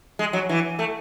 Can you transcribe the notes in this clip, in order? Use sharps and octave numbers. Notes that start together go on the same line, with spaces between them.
G#3
F#3
E3
A3